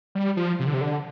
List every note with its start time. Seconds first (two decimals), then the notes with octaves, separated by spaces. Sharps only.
0.15 G3
0.37 F3
0.59 C3
0.67 D3
0.74 C3
0.81 D3